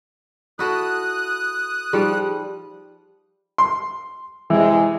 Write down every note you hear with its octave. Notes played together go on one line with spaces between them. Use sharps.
E4 F#4 A4 D#6 F#6
F3 G3 D#4 G4 G#4
C6
C3 E3 G#3